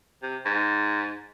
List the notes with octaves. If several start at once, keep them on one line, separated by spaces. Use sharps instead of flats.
C3
G#2